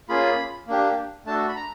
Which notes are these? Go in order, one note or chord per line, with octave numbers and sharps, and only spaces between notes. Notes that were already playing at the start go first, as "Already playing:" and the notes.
A#3 C#4 F4 G#4 B5
A#3 D4 G4
A3 D4 F#4 A4 A5
B5
A#5